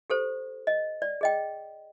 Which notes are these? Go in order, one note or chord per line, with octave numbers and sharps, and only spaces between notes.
G4 A4 C5
D#5
D5
G#4 D#5 G5